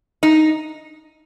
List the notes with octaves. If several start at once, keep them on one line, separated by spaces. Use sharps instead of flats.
D#4